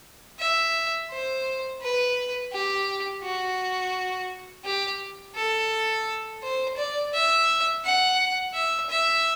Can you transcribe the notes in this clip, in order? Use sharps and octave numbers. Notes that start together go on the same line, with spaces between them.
E5
C5
B4
G4
F#4
G4
A4
C5
D5
E5
F#5
E5
E5